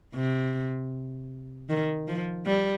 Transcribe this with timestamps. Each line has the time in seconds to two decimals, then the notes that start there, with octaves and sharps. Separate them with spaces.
0.14 C3
1.69 D#3
2.08 F3
2.47 G3